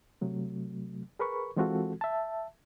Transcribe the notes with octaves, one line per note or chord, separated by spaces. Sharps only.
C3 F#3 A3
G#4 A#4 B4 B5 C#6
E3 G#3 C4 F4 F#4 A4
E5 A5